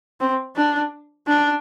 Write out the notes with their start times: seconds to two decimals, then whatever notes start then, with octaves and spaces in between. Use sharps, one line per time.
0.20 C4
0.56 D4
1.28 D4